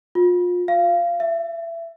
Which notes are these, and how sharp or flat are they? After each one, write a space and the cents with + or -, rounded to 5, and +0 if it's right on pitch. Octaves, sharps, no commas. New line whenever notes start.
F4 +30
F5 -20
E5 +25